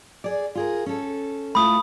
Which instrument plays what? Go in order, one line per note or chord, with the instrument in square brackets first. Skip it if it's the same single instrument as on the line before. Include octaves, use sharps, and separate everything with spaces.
[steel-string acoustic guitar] G#4 D5
F4 G#4 A#4
C#4 A4
[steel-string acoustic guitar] A3 E4 F4 [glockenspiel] B5 D#6